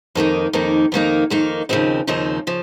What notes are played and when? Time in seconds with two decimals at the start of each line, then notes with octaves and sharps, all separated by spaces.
0.15 F2 D#3 A#3 D#4
0.53 F2 D#3 A#3 D#4
0.92 F2 D#3 A#3 D#4
1.30 F2 D#3 A#3 D#4
1.69 D#2 C#3 F3 C4 D#4
2.07 D#2 C#3 F3 C4 D#4
2.47 C#3 F3